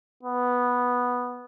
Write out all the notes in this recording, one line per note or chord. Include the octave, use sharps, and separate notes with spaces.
B3